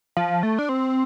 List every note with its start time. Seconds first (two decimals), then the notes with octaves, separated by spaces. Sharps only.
0.17 F3
0.43 A3
0.59 D4
0.69 C4